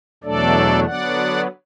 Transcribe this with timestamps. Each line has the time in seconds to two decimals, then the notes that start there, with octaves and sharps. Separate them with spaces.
0.24 E2 B2 F#3 A3 D4 A4 D5
0.85 D3 F#3 B3 D4 D5 F#5